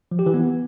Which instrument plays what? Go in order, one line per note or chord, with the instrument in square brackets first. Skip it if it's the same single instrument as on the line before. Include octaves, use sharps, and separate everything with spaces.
[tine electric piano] F3
G4
E3
B3